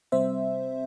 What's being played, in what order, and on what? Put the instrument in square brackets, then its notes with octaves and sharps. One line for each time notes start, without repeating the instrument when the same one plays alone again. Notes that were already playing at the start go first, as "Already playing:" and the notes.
[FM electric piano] C3 G3 C4 C5 E5